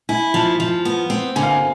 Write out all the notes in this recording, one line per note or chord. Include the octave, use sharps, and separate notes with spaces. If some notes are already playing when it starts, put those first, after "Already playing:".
E4 G#5
F3 A5
F3
B3
C4
D3 G#5
F5
G#5